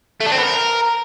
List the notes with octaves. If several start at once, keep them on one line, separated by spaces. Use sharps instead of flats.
A3
D4
C4
B3
A#4